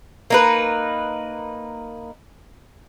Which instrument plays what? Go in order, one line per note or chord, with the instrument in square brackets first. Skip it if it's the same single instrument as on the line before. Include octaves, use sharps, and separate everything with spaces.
[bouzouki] A#3 D#4 B4